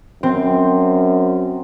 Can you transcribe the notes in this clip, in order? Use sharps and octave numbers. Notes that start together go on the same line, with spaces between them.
F#2 C4